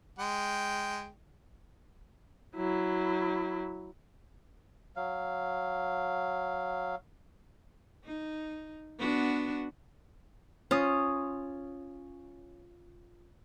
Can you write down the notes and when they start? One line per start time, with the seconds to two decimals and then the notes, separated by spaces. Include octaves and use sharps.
0.19 G#3 G5
2.55 F#3 E4
4.96 F#3 F5
8.05 D#4
8.99 B3 D4 F#4
10.71 C#4 F4 D#6